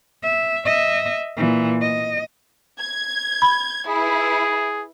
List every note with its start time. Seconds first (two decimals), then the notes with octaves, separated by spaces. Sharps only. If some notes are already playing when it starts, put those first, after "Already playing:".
0.23 E5
0.66 D#5 E5
1.37 A#2 E3
1.82 D#5
2.80 G#6
3.42 B5
3.88 E4 G#4 B4